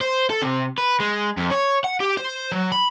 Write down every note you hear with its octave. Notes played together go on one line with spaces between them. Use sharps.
C5
A4
C3
B4
G#3
F2
C#5
F#5
G4
C5
F#3
B5